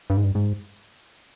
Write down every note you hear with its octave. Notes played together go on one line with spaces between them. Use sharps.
G2
G#2
G2
G#2